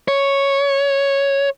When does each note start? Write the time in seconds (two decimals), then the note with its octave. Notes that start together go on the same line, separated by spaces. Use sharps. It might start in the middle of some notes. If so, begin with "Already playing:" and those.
0.08 C#5